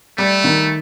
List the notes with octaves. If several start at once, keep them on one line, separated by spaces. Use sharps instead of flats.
G3 A3
D#3